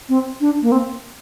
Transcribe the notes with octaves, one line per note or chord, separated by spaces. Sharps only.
C4
D4
A#3
C4